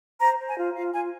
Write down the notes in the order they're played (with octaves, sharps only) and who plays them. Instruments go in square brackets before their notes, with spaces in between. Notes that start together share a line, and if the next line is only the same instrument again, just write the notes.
[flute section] C5 A#5
C5
G#5
F4
F4 F5
F4 G#5